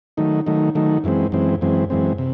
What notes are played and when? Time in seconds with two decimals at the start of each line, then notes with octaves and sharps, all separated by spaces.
0.17 D#3 F#3 A3 D#4
0.46 D#3 F#3 A3 D#4
0.75 D#3 F#3 A3 D#4
1.04 F#2 E3 G#3 C4
1.32 F#2 E3 G#3 C4
1.61 F#2 E3 G#3 C4
1.90 F#2 E3 G#3 C4
2.18 C3